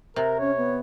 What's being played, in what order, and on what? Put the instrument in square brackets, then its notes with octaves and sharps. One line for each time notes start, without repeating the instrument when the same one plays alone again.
[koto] C3 [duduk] A#4
[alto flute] C#4 [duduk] C#5
[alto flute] B3